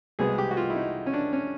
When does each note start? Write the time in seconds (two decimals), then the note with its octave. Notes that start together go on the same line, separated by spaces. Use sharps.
0.19 C2 B2 G#3 B3 G#4
0.38 G4
0.51 F#4
0.57 F4
0.70 E4
0.76 D#4
1.06 C#4
1.13 D4
1.33 C#4